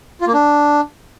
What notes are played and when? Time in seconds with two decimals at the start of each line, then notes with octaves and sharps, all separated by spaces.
0.21 F4
0.27 A#3
0.34 D4